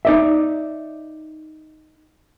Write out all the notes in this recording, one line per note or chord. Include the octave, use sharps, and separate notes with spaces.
D#4 D5 E5